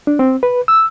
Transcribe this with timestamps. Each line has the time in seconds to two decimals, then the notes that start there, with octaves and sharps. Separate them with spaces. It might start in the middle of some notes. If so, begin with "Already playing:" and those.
0.07 D4
0.19 C4
0.43 B4
0.68 E6